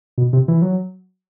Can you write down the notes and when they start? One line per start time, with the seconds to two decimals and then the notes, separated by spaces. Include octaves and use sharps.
0.18 B2
0.33 C3
0.48 E3
0.62 F#3